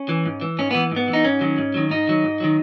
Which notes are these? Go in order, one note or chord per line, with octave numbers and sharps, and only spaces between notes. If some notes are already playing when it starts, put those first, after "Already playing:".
Already playing: C#4
E3
G#2
E3
G#2 C#4
E3 B3
G#2 B3
E3
D#4
G#2 C#4
D#3 F#3
G#2
D#3 F#3
G#2 D#4
D#3 F#3
G#2
D#3 F#3